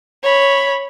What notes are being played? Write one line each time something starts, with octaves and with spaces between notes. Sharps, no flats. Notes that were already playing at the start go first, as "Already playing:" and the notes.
C#5 B5